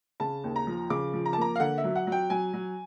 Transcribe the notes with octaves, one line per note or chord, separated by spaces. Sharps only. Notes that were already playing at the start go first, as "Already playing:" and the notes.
C#3 A5
D#2
A#5
F3
C#3 D6
F3
A#5
A5
A#3 A#5
F5
D3 F#5
E5
F#3
F#5
F#3 G5
F#3 G#5
F#3